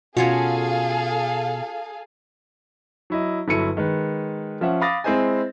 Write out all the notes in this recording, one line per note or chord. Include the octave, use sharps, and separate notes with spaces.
B2 C#4 F4 F#4 G#4 A4 F5
F#3 E4 D#5
G1 F#3 E4 A4 C#7 D#7
D#3 G#3 B4
F3 C#4 E5 F#5
F5 B5 D6 D#6 A6 A#6
G#3 C4 E4 C5 D#5 G#5